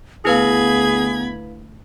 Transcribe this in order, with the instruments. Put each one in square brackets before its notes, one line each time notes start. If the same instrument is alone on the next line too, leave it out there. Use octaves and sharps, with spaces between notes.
[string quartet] D2 B5 G#6 [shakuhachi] B3 [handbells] E4 B4 F5 [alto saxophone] G#4